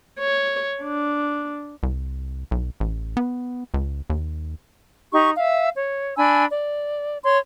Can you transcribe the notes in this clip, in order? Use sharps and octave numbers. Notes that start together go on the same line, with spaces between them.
C#5
D4
C2
B1
A1
B3
C#2
D#2
D#4 G4 C#6
E5 F5
C#5
D4 G#5 B5 E6
D5
C#5 C6